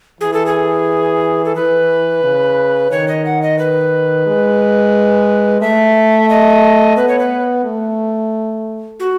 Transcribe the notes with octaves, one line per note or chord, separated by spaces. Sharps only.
E3 G#4
A4
G#4
A4
E3 B4
C#3
D#3 C#5
D#5
F#5
D#5
B4
G#3
A3 E5
D#5
B3 B4
C#5
B4
A3
F#4